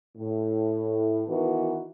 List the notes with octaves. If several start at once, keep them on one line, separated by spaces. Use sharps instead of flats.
A2
D#3 E3 B3 D#4 F#4 A#4